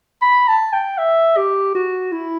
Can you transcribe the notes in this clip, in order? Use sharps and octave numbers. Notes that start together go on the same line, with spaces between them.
B5
A5
G5
E5
G4
F#4
E4